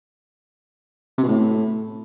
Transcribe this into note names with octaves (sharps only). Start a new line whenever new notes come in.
C3
B2
A2